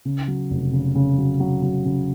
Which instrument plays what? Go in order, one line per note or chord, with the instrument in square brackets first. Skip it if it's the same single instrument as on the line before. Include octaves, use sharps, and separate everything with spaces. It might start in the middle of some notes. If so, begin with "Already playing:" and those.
[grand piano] C#3
F#3
F1
C#3
C#3
F#3
F#3
F#3
C#3